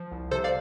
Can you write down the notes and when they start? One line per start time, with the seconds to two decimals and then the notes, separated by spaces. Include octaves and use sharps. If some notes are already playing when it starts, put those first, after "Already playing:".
Already playing: F3
0.12 C2
0.31 C3 A4 C5
0.44 D5 F5